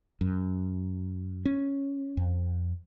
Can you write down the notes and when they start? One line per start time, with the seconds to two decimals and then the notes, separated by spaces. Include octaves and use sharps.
0.21 F#2
1.45 C#4
2.17 F2